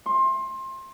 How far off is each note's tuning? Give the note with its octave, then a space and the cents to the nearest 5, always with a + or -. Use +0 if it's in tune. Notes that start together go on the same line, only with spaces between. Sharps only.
C6 +25